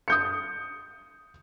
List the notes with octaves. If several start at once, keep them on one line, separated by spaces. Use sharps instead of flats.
D#6 G6 C#7